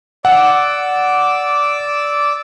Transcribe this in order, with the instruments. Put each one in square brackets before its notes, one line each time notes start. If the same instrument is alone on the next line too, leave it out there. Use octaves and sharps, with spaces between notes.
[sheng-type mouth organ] D5 D6 E6 [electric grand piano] F#5